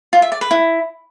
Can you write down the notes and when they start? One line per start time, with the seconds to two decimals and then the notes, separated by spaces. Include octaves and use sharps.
0.13 F4
0.22 E5
0.32 D5
0.41 B4
0.51 E4